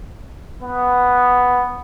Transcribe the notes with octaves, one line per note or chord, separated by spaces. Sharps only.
B3